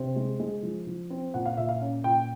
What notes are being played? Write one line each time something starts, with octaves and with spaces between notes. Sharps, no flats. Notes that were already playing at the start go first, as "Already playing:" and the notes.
Already playing: C3 C5
G#3
G#3
F3
F3
C4
A#2 F#5
F5
A#2 E5
F5
C#4
A#2 G5